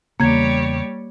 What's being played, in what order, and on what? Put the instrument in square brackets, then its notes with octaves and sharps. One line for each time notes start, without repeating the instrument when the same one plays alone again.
[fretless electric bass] E2 C#3 [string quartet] G3 G4 C#5 [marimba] A#3 G#6